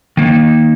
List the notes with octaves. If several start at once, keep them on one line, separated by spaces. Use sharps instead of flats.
D#3 A#3 D#4